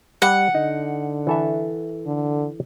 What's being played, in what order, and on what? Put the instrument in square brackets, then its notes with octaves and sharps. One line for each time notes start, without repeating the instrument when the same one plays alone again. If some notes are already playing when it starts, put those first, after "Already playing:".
[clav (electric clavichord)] G3 [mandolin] F#5
[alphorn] D3 [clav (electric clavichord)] D#4
[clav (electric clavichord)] E3 A4 E5
[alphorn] D3